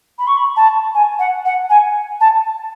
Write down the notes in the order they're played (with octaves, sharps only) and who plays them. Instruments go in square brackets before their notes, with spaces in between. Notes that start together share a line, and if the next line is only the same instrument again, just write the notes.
[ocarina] B5
C#6
B5
A5
G#5
F#5
F#5
G#5
A5